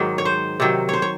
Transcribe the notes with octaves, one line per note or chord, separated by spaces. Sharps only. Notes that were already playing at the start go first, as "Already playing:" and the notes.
Already playing: G#2 D#3 F#3 G#4
C#5
C5
C3 D#3 F#3
C5 C#5
C#5